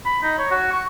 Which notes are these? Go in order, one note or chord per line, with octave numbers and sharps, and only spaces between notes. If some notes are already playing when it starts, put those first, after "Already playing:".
B5
D#4
C#5
F#4
C#6